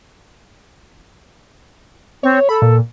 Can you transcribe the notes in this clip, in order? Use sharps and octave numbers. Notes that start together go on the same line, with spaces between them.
C4 C#5
A4 B5
A#2